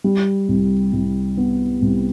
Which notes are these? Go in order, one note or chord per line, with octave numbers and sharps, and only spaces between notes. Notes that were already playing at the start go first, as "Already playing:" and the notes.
G3
C2
C2
B3
C2